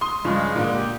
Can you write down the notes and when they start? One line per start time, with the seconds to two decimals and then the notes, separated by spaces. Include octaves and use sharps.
0.01 C6 D#6
0.25 G2 C#3 F3 G#3
0.56 A#2 D3 A#3
0.74 G4